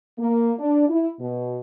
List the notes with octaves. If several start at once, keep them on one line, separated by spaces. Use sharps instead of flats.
A#3
D4
E4
B2